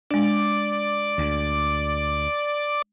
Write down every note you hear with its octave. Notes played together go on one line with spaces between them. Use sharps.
G#3 D4 D5 D6
D2